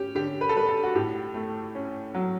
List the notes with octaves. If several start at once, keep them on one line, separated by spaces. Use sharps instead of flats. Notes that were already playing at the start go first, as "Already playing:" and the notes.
Already playing: C#4 G4
D3 G4
B4
A4
G3 B4
A4
F#4
A2 G4
A3
C#4
F#3